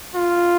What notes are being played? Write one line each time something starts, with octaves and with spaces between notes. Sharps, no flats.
F4